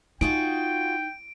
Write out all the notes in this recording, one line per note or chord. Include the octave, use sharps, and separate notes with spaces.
D#4 F4 F#4 G#4 G5 D7